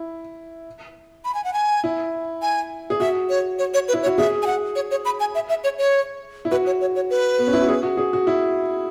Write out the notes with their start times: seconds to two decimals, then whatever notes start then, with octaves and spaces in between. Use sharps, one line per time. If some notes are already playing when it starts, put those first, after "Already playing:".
Already playing: E4
1.25 B5
1.34 G#5
1.44 F#5
1.54 G#5
1.84 E4
2.42 G#5
2.90 G#4
3.00 F#4 E5
3.29 C#5
3.59 C#5
3.74 C#5
3.88 B4
3.93 E4
4.03 C#5
4.06 F#4
4.18 G#4 E5
4.42 G#5
4.47 F#5
4.76 C#5
4.91 C#5
5.05 B5
5.20 G#5
5.35 E5
5.49 E5
5.64 C#5
5.79 C#5
6.45 E4
6.51 F#4 B4
6.66 C#5
6.81 C#5
6.96 C#5
7.10 B4
7.38 B3
7.47 C#4
7.53 E4
7.62 F#4
7.68 G#4
7.83 F#4
7.97 G#4
8.13 F#4
8.27 E4